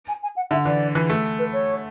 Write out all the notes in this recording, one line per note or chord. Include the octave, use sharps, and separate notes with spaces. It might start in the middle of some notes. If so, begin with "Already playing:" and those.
G#5
G#5
F#5
D3 E5
E3 D5
E3
A3
B4
C#5